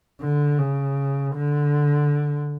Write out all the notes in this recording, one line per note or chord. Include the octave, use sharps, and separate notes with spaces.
D3
C#3
D3